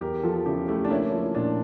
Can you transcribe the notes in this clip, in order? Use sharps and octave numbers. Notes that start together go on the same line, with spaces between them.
E2 G4 A#4
F3 F4 A4
C#3 E4 G4
A3 E4 G4
D4
A#3 C#4 E4
F3
A#2 D4